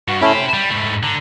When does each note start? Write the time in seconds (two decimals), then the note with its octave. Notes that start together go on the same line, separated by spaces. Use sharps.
0.08 G2 F#4
0.21 A3 C#4 E4 G4 C5
0.34 B5
0.53 G3
0.71 G#2 A3
1.03 D3 A#5